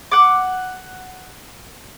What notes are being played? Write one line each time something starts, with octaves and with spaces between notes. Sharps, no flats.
F#5 D6